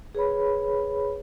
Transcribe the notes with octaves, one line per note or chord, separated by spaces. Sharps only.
G#4 B4 C#5 B5